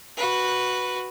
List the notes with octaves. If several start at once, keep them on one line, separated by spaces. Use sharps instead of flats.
F#4 B4